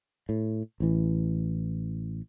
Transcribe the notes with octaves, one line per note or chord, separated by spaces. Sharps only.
A2
A1 E3